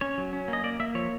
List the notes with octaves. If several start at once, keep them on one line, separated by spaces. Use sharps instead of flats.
C#4 C#5
F#3
C#4
A#3
D#5
A#3 D5
A#3 E5
F3 C#5